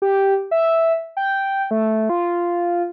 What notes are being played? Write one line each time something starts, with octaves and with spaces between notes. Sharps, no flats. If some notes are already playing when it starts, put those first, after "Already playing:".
G4
E5
G5
A3
F4